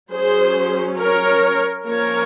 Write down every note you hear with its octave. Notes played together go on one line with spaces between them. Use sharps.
F#3 C#4 G#4 C5
A#4 C#5
F3 A#3 C#4 A#4 C#5